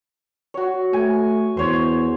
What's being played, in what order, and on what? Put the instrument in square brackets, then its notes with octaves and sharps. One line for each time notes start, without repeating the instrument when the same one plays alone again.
[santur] F#4 C#5
[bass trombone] A3 [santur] G#5
[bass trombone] E2 [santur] C5 C#5